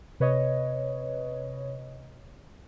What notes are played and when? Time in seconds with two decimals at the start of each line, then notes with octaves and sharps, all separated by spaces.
0.20 C3 B4 C#5 D#5